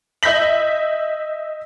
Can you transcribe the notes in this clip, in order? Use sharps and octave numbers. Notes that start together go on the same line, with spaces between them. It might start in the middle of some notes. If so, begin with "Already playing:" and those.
D#5 E5 G6 A#6 B6 F#7